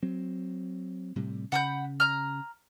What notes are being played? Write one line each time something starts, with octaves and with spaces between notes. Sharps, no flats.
F#3 C4
A2 C3 G3
C#3 F#5 B5 G6
A#5 F6